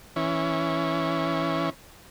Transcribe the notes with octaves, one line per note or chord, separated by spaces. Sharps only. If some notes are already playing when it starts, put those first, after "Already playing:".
E3 C#4